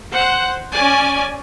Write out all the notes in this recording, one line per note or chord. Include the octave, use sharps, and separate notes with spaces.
C5 F#5
C#4 D5 G#5